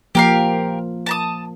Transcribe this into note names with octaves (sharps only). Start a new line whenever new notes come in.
F3 A#3 G4 A#4 F5
A5 A#5 D#6